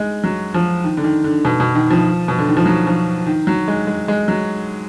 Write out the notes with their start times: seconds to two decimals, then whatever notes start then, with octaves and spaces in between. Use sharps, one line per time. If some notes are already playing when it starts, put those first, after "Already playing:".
Already playing: G#3 D#4
0.24 F#3
0.54 F3
0.84 D#3
0.97 D3
1.04 D#3
1.24 D3
1.45 B2
1.60 B2
1.75 D#3
1.90 F3
2.28 B2
2.38 D3
2.48 D#3
2.57 F3
2.66 F#3
2.87 F3
3.26 D#3
3.47 F#3
3.68 G#3
3.87 G#3
4.08 G#3
4.28 F#3